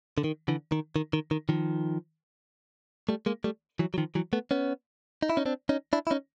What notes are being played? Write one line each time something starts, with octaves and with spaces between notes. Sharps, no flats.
D3
D#3
D3 E3
D#3
D#3
D#3
D#3
D#3 F3
G3 A3
G#3 A#3
G3 A3
E3 F#3
F#3
D#3 F3
E3 F#3
A3 B3
B3 C#4
D#4
E4
C#4 D#4
C4 D4
C#4 D#4
D4 E4
E4
C#4 D#4